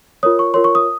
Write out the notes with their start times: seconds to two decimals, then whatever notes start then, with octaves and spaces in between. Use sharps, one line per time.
0.23 F4 A#4 C#5 D#6
0.39 C#6
0.54 F4 A#4 C#5 C6
0.64 C#6
0.75 D#6